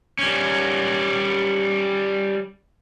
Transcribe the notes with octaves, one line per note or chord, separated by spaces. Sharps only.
G3 C#4